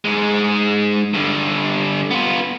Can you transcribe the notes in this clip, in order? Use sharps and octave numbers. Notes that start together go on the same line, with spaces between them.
G#2 G#3
G2 D3
B3 F4